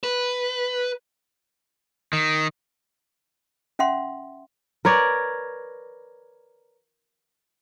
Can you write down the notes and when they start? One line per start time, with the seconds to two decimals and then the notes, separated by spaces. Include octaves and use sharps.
0.03 B4
2.13 D#3
3.79 C#4 E5 F#5 C6
4.85 A#4 B4 C#5 D5